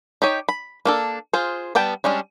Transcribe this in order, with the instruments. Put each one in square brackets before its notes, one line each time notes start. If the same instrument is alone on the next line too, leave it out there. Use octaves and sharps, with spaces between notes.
[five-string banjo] D#4 G4 C#5
B5
A#3 D4 A4
F4 G#4 C5
G3 B3 G5 A5
G3 G#3 C#4 D4